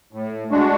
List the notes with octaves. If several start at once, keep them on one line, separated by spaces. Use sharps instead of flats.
A2
G#3 D4 F#4